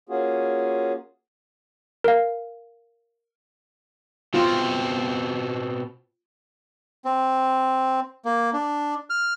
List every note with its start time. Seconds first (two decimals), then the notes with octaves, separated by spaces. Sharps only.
0.09 A#3 C#4 F4 F#4 G#4
2.04 A#4 F5
4.34 B2 C4 F4
7.05 C4
8.25 A#3
8.53 D4
9.10 F6